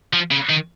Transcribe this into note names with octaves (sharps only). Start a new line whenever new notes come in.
F3
C#3
D#3